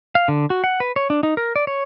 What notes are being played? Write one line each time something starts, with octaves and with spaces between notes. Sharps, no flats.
F5
D3
F#4
F#5
B4
C#5
D4
D#4
A#4
D5
C#5